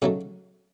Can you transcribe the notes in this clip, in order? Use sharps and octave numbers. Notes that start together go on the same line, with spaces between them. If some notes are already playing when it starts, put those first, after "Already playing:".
C#3 F#3 A3 D#4 F#4